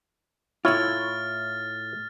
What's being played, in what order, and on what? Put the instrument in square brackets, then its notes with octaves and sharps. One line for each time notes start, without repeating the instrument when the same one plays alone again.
[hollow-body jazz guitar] A2 F4 [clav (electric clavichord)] E4 C#5 [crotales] F6 A6